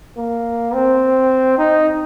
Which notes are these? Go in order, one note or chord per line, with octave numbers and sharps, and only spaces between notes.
A#3
C4
D#4